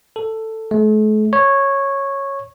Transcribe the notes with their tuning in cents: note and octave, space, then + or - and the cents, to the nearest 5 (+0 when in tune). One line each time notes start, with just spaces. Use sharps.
A4 +10
A3 -45
C#5 -10